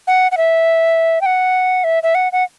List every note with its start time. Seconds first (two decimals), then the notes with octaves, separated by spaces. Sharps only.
0.07 F#5
0.32 F#5
0.37 E5
1.21 G5
1.26 F#5
1.84 E5
2.03 E5
2.15 F#5
2.32 F#5